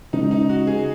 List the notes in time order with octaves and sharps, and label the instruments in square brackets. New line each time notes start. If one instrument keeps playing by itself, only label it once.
[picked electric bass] C#3 G#3 C#4 [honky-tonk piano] D#4
[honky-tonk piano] D#4
F#4
G#4